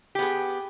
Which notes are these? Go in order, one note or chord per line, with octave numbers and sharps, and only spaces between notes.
B3 G4 G#4